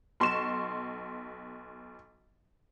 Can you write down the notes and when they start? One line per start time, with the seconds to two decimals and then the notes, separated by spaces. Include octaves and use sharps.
0.20 B1 C6 C#6 E7